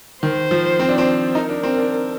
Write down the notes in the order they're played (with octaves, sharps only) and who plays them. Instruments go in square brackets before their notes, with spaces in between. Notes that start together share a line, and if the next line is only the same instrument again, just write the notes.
[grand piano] D#3 [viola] C5
[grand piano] F3
C4
D4
C4
[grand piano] D#4 [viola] A#4
[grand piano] D4
C4
D4